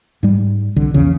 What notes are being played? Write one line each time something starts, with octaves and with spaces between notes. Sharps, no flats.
G#2 G3
C2 D3
A#1 E2 C#3